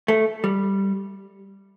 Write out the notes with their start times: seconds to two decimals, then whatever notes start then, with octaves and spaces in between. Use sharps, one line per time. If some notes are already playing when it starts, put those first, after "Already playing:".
0.08 A3
0.44 G3